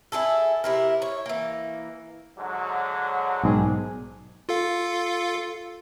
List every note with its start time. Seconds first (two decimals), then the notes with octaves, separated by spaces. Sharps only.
0.12 E4 F4 G#4 A4
0.64 C3 E4 A#4
1.02 C#5
1.26 E3 A#3
2.38 G#2 D3 F#3
3.43 B1 G#2 D#3 D4 G#4
4.49 F4 A4 F5